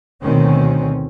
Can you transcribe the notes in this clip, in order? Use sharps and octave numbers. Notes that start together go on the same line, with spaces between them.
D2 B2 D#3 C4 C#4